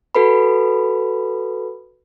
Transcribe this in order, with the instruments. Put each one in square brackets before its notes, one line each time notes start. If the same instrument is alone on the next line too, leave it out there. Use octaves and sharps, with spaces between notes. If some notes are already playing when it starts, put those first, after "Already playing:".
[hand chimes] F#4 A4 B4 B5